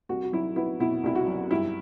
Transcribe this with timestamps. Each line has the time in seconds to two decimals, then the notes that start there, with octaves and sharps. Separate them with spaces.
0.09 C2 F#4
0.23 F#4
0.33 F#3 E4
0.56 B3 E4
0.80 B2 E4
1.03 C2 E4
1.15 F#4
1.27 F#3
1.51 G2 E4